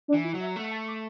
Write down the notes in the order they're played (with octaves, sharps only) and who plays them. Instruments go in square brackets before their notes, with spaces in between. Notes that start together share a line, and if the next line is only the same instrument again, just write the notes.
[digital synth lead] D4
[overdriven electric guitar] E3
[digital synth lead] E4
[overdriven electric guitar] F#3
[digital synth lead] E5
[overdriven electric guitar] A3 [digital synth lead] F#5
[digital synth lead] A5
D6